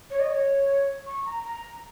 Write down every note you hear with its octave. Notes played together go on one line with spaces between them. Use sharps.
C#5
D#5
C#5
C#6
A#5
A#5